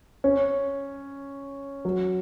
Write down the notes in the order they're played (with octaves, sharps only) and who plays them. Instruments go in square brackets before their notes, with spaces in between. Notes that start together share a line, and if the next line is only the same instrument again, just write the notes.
[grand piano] C#4
F#3